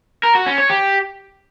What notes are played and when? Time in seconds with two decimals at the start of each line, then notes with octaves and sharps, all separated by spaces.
0.23 A#4
0.35 F#4
0.46 C#4
0.58 C#5
0.70 G4